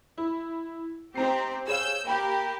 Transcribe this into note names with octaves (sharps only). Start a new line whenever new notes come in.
E4
C4 D#4 G4 A#5 C7
G#4 C#5 F5 E6 G6
A#3 G4 G5 B5 G6